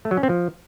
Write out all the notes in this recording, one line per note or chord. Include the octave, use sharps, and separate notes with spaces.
A3
F#3
C#4
C4
F3